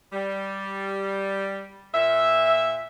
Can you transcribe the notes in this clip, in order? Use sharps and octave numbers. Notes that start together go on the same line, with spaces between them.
G3
A#2 E5